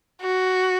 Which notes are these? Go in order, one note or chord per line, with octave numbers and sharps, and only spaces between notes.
F#4